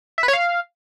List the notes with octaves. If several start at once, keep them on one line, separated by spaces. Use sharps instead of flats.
E5
B4
C#5
F5